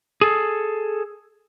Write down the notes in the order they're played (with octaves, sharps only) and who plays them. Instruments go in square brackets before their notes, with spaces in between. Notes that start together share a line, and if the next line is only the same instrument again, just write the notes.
[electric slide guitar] G#4 A4